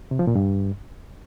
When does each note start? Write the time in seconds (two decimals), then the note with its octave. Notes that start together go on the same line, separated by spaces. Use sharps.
0.11 C3
0.19 F3
0.27 A#2
0.35 G2